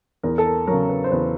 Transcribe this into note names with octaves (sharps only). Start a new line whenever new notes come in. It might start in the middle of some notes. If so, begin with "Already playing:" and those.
E2 A#4
A4
A#4
C#3 F#3 A#4
B4
C5
E2 B4